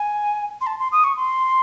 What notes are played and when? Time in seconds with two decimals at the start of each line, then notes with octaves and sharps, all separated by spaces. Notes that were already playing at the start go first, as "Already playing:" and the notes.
Already playing: G#5
0.61 C6
0.67 A5
0.79 C6
0.92 D#6
1.04 C#6
1.17 C6